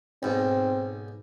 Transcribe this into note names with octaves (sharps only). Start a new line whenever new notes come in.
B1 G#2 C4